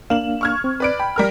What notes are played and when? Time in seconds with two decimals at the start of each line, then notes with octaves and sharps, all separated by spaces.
0.10 A#3 D4 F5 E7 F#7
0.41 C#6 F6 G#6
0.64 C4
0.80 B4 D5 D7
1.00 G5 B5
1.16 G3 A#4 F6